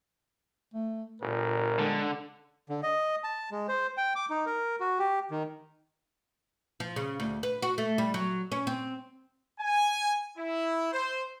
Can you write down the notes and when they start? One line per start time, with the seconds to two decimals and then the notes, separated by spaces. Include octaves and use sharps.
0.74 A3
1.22 G1 A#2 A#4
1.79 D3 G#3
2.69 D3
2.83 D#5
3.24 A5
3.51 G#3
3.68 C5
3.97 G5
4.16 D6
4.30 D#4
4.46 A#4
4.80 F#4
4.99 G4
5.31 D#3
6.80 F3
6.96 C#3
7.20 D2
7.43 B4
7.62 F#4
7.78 A3
7.98 G3
8.14 F#3
8.52 C#4
8.67 C4
9.60 G#5
10.38 E4
10.92 C5